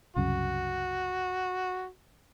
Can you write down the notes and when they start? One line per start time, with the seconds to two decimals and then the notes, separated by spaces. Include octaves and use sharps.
0.16 C2 F#2 C#3 F#4